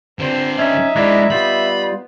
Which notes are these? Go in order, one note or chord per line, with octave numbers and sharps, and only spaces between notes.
G2 D3 C4 C5
C#4 D#4 E5
G#3 D4 E4 A#4 F5
G3 B3 D#4 F4 B5